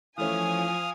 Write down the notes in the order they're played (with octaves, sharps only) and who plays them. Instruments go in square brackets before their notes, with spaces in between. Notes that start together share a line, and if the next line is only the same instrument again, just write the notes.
[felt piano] E3 A3 C#4 [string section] F3 G#5 [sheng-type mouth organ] F5 D#6